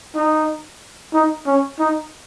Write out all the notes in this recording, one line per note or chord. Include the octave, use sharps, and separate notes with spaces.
D#4
D#4
C#4
D#4